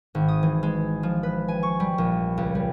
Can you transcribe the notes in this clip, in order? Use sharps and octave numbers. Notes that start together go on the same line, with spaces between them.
G#1
D#6
E3
G#3
F3
B4
G#5
C#6
G3
A#1
C#2
G3